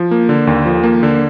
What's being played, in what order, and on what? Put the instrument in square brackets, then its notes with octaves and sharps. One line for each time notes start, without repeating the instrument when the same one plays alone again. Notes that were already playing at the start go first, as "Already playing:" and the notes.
Already playing: [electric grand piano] F3
A#3
D3
D#2
F3
A#3
D3